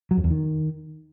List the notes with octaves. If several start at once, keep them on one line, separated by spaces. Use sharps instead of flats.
F#3
F2
E2
D#3